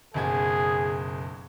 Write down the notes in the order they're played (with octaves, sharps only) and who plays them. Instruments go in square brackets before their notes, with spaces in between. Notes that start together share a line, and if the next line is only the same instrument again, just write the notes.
[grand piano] F#1 B1 G#6 [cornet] G#4